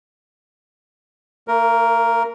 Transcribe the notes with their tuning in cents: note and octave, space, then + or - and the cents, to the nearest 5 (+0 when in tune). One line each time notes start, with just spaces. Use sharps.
A#3 -40 A#4 +0